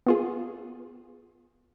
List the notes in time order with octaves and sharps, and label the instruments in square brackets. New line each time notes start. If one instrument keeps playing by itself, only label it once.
[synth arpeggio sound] B3 F4 G#4